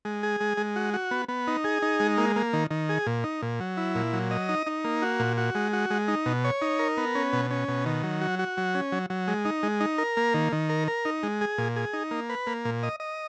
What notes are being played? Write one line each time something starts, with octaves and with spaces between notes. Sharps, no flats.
G#3
G#4
G#3
G#3
F#4
F#4
B3
B3
D#4
G#4
D#4
G#3
A#3
A#3
D#3
D#3
G#4
A#2
D#4
A#2
F#3
E4
A#2
F#3
D#5
D#4
D#4
A#3
F#4
A#2
F#4
G#3
F#4
G#3
D#4
B2
C#5
D#4
A#4
B3
C#4
B2
C#4
B2
D#3
F#3
F#4
F#4
F#3
C#4
F#3
F#3
G#3
D#4
G#3
D#4
A#4
A#3
D#3
D#3
A#4
A#4
D#4
G#3
G#4
A#2
G#4
D#4
A#3
B4
A#3
A#2
D#5
D#5